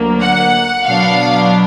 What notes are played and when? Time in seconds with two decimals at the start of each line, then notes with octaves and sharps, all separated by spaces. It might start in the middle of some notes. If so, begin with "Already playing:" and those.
Already playing: D2 D3 F#3 A#3
0.20 F#5
0.85 B2 F#3 B3 D4 F5